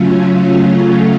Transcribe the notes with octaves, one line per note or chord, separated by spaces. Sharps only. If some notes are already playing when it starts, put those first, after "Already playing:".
Already playing: C#3 F#3 A3 C#4 F4